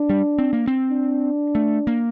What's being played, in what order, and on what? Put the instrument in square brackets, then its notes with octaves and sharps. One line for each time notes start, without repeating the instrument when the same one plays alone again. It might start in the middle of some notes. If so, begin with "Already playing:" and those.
Already playing: [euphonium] D4
[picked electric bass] G3
C4
A#3
C4
[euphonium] D4
[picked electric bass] A3
A#3